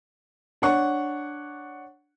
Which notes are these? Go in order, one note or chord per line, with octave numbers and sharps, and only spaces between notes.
D4 C#5 F#5 C#6